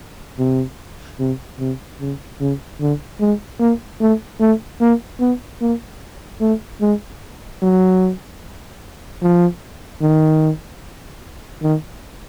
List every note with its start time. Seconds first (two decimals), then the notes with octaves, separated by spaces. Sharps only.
0.39 C3
1.20 C3
1.60 C3
2.00 C#3
2.40 C#3
2.80 D3
3.20 G#3
3.60 A#3
4.01 A3
4.41 A3
4.81 A#3
5.20 B3
5.61 A#3
6.41 A3
6.81 G#3
7.62 F#3
9.22 F3
10.02 D#3
11.63 D#3